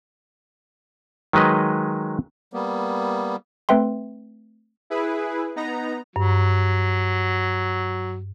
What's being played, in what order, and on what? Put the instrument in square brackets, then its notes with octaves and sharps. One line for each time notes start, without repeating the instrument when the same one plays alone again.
[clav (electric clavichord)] D#3 F#3 G#3 B4 D#5
[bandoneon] G3 A#3 B3
[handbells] A3 C4 B4 E5 G5 C6
[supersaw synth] E4 G#4 B4
B3 D#4 A#5
[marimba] G2 [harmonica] F#3